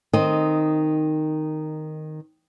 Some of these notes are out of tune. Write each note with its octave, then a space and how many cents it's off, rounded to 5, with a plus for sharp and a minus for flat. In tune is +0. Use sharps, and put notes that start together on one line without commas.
D#3 -10 C4 +0 D#5 +0